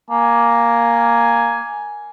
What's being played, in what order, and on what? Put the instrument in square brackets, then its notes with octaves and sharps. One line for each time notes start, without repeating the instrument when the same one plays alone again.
[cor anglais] A#3 [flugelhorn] G#5